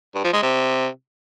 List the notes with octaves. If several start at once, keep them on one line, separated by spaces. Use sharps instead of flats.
G2
F3
G#3
C3